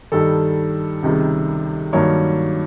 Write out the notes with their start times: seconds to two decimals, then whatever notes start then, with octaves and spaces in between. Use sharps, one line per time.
0.12 G2 D#3 G3 A4
1.02 C#2 C3 D#3 G3
1.93 G2 D#3 F#3 A#3 C#5